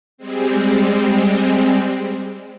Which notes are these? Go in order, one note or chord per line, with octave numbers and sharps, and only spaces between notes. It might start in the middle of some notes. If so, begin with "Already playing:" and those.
G3 G#3 C4